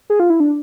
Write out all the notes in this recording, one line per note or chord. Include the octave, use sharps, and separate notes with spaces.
G#4
F4
E4
D4